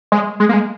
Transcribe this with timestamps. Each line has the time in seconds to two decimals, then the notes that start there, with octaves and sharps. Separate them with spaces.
0.12 G#3
0.40 G#3
0.49 A#3
0.54 G#3